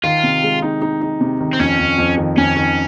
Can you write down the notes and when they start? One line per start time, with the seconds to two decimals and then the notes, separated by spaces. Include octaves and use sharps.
0.04 D#3 F4
0.23 C3
0.43 G#3
0.62 D#4
0.82 D#4
1.01 D#4
1.21 C3
1.41 D#3
1.53 C4
1.60 F2 C#4
1.79 F2
1.98 F2
2.18 D#3
2.37 F2 C#4
2.56 D#3